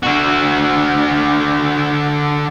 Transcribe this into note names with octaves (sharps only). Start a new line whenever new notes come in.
D3 F#4